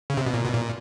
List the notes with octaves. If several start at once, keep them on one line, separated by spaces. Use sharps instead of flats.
C#3
C3
B2
A#2
B2
A#2